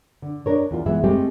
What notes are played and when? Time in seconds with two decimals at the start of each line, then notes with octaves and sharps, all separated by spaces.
0.22 D3
0.46 D4 A#4 C#5
0.71 E2 F4
0.86 E3 G#3 B3 G#4 E5
1.04 G#3 A3 C4 G4